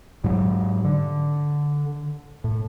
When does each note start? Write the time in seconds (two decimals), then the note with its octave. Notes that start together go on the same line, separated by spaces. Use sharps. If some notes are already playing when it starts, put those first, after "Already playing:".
0.24 G#2 F#3
0.84 D3
2.44 A2